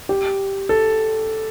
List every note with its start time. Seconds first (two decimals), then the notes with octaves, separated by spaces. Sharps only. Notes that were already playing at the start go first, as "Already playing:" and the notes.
0.09 G4
0.69 A4